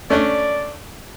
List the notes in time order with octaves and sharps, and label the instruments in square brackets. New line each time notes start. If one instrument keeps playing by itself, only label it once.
[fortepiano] A3 C#4 D4 [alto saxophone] D5